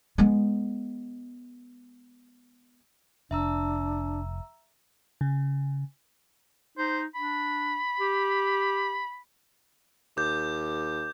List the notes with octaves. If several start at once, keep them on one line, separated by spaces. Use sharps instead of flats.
G#3 B3
F1 D4 E5 A#5 E6
C#3
D#4 C5
D4 B5
G4
D#2 D6 G6